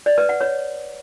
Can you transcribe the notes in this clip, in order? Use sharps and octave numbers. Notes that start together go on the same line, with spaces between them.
D5
B4
F#5
C#5